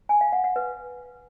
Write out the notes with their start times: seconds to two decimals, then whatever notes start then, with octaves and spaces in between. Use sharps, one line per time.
0.09 G#5
0.21 F5
0.33 F#5
0.44 F#5
0.56 B4